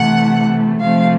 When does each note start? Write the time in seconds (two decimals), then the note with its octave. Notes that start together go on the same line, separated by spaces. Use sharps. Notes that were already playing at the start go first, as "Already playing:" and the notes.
Already playing: C3 E3 A3 F#5
0.81 C3 F3 A3 C4 F5